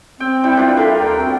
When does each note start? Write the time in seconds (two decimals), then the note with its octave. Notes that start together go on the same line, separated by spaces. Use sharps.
0.20 C4 G5
0.44 G3 E4
0.57 D4 F4 B4 D5
0.77 G3 D#4 A4 A#4 E5
0.99 D#2 A#4 G5 A#5
1.19 C4 F#4